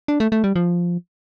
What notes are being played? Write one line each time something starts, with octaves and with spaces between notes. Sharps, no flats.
D4
A3
A3
G3
F3